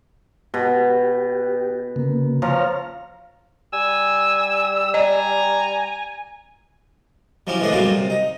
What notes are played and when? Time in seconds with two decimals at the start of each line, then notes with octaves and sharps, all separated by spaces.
0.54 B2 G4
1.96 C#3 A#3
2.42 F3 C#5 A#5 F6
3.73 G3 G#5 E6
4.94 D5 D#5 G#5 A#5
7.47 F3 F#3 C#4 E4 G4
7.59 E3 G#3 A3 B3 D4 G#4
7.72 F#2 A#2 F#3 G3 C4 F4
7.94 C3
8.10 D#4